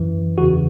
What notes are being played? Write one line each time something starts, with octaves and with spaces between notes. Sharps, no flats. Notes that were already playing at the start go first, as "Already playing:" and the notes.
Already playing: F#2 E3
E2 C#3 E3 F#4